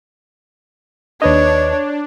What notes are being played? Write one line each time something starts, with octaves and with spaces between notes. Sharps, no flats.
D#2 D4 B4 C#5 D#5